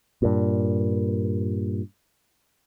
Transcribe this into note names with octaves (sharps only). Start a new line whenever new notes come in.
G2 A#2